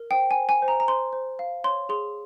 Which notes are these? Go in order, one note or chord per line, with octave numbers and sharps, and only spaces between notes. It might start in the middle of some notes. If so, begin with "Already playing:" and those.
Already playing: A#4
C5 G5
G#5
C5
G#5
C5
A#5
A#5
C5 C6
C5
F5
C#5 C6
G#4 C6